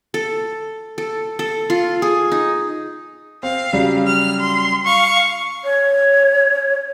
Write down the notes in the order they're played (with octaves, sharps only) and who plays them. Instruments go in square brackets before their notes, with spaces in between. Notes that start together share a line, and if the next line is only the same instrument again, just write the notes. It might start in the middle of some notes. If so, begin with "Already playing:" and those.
[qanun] A4
A4
A4
F4
G#4
D#4
[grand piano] C4 [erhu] F5
[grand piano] C#3 F#3 G3
[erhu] F6
C6
[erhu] F5 [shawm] C#6
[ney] C#5